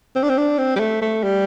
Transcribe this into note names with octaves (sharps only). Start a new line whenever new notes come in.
C4
D4
C4
D4
C4
G3
A3
A3
G3